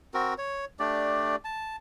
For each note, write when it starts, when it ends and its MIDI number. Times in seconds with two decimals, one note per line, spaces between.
0.14 0.34 60
0.14 0.34 66
0.14 0.34 70
0.38 0.65 73
0.80 1.36 57
0.80 1.36 62
0.80 1.36 67
0.80 1.36 74
1.45 1.76 81